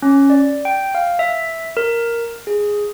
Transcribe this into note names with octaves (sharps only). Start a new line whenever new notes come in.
C#4
D5
G5
F5
E5
A#4
G#4